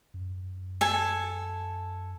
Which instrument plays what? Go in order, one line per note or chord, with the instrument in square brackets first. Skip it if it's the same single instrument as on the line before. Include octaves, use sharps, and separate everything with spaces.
[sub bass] F#2
[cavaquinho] A4 G#5